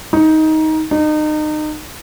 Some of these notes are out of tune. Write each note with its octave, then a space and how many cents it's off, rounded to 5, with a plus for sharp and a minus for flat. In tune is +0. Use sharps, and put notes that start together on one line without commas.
D#4 +15
D#4 -30